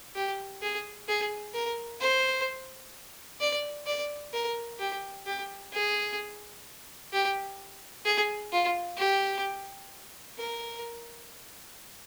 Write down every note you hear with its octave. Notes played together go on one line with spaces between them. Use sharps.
G4
G#4
G#4
A#4
C5
D5
D5
A#4
G4
G4
G#4
G4
G#4
F4
G4
A#4